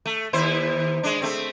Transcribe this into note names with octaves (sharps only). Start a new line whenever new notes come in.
A3
D#2 E4 C5
G#3 D4
A3 C4